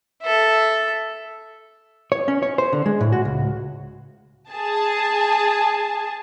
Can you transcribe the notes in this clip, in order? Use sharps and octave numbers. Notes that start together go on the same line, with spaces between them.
A4 E5
C#5
C#4
C#5
C5
D3
G#3
A2
F#4
C#2
G#4 A5